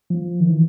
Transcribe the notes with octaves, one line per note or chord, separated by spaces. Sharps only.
F3
D#3
E3